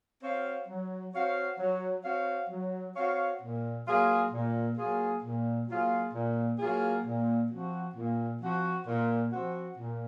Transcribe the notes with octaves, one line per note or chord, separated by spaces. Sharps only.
C4 F#4 C#5 F5
F#3
C4 F#4 C#5 F5
F#3
C4 F#4 C#5 F5
F#3
C4 F#4 C#5 F5
A#2
F#3 A#3 F4 G#4
A#2
F#3 A#3 F4 G#4
A#2
F#3 A#3 F4 G#4
A#2
F#3 A#3 F4 G#4
A#2
F3 C4 F#4
A#2
F3 C4 F#4
A#2
F3 C4 F#4
A#2